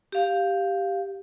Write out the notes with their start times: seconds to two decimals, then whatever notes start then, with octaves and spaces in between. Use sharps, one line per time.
0.12 G4 F5